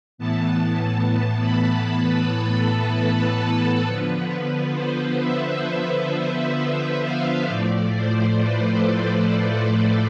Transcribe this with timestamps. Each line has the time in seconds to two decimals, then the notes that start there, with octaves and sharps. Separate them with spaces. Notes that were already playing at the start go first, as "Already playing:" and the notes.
0.18 A2 E3 B3 A5
0.64 A5
1.10 A5
1.41 B5
2.01 B4
2.46 A4
2.92 A4
3.38 B4
3.84 D3 F3 B3
4.75 C5
5.21 E5
6.57 E5
7.03 F5
7.48 A2 F3 A3 D5
7.94 C5
8.40 B4
8.70 A4
9.01 B4
9.32 C5
9.77 D5